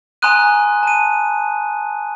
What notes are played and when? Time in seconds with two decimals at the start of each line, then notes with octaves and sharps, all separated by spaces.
0.22 G#5 A#5 C6 D#6 F#6 D#7
0.83 A5 D#7